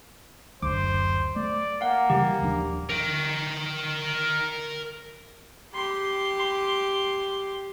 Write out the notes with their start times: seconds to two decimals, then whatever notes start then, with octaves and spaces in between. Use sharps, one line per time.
0.62 F#1 D2 C5 D6
1.36 A3 D5
1.81 A#3 F5 F#5
2.10 C#3 E3 G3 G4
2.41 D#1 F3 D4
2.90 A#4 G5
5.74 G4 C6